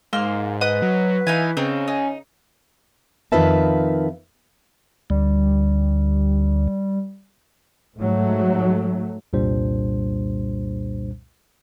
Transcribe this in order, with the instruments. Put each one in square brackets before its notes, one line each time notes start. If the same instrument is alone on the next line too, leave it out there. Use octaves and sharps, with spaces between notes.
[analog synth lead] G#2 [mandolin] A#3 C6 F6
[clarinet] B4 [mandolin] D#5 F#5 D#6
[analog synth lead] F#3
[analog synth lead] E3 [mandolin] D#4 F5 G#5
[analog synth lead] C#3 [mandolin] C4 D#4
[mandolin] D#4 [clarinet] G#5
[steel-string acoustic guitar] F2 D#3 F4 B4 E5 A5
[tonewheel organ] D2 [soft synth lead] G3
[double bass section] G#2 F#3 A3
[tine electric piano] C2 F2 A#2 G3 D4 C5